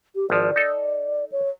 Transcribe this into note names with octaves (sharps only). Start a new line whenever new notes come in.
G4
G#1 F3 D5
D#4 A4
C#5